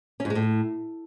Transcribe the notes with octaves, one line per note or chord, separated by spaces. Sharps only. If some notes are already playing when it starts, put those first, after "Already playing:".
C#4
G#2
G#3
A2